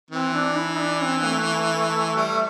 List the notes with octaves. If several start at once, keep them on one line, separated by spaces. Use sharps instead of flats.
E3 C4
D4
E4
D4
C4
A3
G3